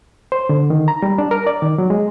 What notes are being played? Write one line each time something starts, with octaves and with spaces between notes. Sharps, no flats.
C5
D3
D#3
A#5
G3
D4
A#4
D5
D#3
F#3
G#3